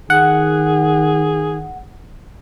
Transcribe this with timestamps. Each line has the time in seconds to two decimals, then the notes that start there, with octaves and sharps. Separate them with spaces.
0.10 D#3 G#4 F#5